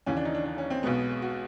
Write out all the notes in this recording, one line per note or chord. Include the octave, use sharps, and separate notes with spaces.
D#2 C#3 E3 C#4
D4
D#4
D4
D4
C#4
C4
B1 B2 G#3 B3
F#4